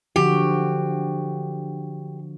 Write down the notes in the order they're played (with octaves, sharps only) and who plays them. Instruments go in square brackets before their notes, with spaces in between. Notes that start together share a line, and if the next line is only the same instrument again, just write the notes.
[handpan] D3 F3 F#4 [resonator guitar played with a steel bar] G4